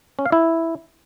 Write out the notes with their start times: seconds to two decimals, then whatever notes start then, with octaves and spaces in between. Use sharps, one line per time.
0.19 C#4
0.26 F5
0.32 E4